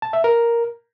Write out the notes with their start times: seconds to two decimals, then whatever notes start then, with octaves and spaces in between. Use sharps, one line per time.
0.02 A5
0.13 E5
0.24 A#4